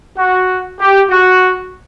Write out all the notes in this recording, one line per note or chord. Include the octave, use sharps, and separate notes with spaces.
F#4
G4
F#4